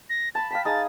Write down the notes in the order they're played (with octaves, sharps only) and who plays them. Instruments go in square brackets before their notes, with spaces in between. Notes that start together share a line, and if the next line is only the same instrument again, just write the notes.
[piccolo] A#6
[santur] A5 B5 [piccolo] A6
[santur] F5 G5 A5 [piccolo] B6
[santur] D#4 G#4 [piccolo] A6